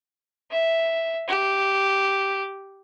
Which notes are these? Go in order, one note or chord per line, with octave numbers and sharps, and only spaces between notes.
E5
G4